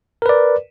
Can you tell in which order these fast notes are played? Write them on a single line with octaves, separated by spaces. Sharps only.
A#4 B4 D5